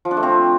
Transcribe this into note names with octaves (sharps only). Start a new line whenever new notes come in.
F3
D4
A3
C4